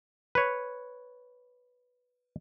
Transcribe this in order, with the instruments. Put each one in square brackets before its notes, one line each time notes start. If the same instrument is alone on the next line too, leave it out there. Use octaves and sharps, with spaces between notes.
[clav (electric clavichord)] B4 C#5